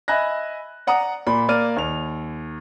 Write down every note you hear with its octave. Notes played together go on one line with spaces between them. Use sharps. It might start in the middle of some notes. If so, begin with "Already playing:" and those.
D#5 E5 G#5 B5 F#6 A#6
D5 F#5 A#5 D#6
A#2 D5 B5
A#3 D5 F6 D#7
D#2 F7